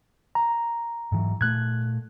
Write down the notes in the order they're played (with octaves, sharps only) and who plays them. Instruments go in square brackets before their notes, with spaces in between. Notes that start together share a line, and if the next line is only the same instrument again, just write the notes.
[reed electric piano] A#5
[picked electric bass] G#2 E3 F#3
[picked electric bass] A#2 A3 [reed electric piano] F#6 G#6